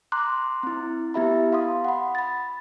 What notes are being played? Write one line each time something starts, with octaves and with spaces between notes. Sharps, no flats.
A#5 C6 D6 F#6
C4 E4
B3 E4 G4 E5 A#5 B5
F5 C6 D#6
F#5 B5
B5 A6